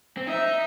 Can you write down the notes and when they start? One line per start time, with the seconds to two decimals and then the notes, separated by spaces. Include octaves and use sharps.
0.17 C4
0.27 D#4 E5